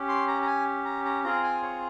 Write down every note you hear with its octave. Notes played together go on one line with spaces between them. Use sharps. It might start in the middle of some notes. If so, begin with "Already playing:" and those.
Already playing: C#4 G4
C6
A#5
A#5
G#5
A#5
A#5
C4 F4 G#4 A#5
G#5
C#5